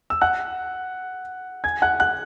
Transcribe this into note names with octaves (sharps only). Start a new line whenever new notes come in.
E6
F#5 F#6
G#5 G#6
F#5 F#6
F#5 F#6